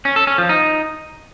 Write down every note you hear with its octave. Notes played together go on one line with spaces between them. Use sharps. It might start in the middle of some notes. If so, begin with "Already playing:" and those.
C#4
A4
C#4
F3
D#4